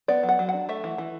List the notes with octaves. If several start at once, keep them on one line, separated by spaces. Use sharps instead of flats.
B3 D5
F#3
F#5
F#3
F#5
D4
A3 E5
E3
E3